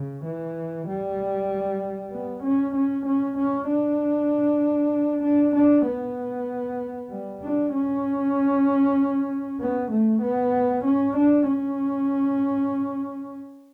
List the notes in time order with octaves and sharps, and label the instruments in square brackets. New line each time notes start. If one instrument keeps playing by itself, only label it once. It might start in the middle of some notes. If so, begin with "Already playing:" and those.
Already playing: [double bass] C#3
E3
G3
B3
C#4
C#4
C#4
C#4
D4
D4
D4
B3
G3
D4
C#4
B3
A3
B3
C#4
D4
C#4